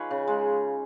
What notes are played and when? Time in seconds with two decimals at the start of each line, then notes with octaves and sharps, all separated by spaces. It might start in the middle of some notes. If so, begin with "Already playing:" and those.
Already playing: F3 C#4 D#4 G#4 B4 C#5
0.11 C#3
0.27 G#3